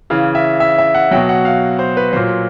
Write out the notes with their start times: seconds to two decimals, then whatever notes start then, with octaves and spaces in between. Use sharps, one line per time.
0.10 C#3 E3 F5
0.35 E5
0.60 E5
0.78 E5
0.95 F#5
1.11 F#3 G5
1.16 B2
1.29 F#5
1.45 F5
1.79 C5
1.97 B4
2.13 A#2 F#3 C5